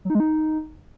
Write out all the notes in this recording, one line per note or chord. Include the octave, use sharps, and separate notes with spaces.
F#3
D#4
G#3
D#4